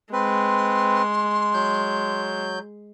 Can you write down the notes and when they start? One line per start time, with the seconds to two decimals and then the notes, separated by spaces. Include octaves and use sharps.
0.13 G#3 C4 B4 C6
1.54 F#3 G6